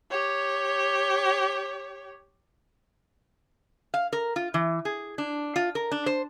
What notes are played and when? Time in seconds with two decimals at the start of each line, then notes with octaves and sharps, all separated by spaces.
0.11 G4 C#5
3.94 F5
4.13 A#4
4.36 F4
4.54 E3
4.85 G#4
5.18 D4
5.56 F4
5.75 A#4
5.92 D4
6.06 C5